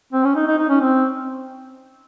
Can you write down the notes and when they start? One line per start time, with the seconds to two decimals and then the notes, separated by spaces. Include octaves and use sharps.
0.13 C4
0.24 C#4
0.36 D#4
0.47 D#4
0.58 D#4
0.70 C#4
0.81 C4